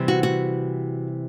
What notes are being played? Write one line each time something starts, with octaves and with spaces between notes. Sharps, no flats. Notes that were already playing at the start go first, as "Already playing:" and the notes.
Already playing: C3 E3 G3 C4
F#4
F#4